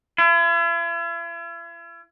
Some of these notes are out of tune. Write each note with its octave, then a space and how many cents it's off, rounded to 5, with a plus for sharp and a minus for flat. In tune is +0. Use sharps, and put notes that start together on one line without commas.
E4 +45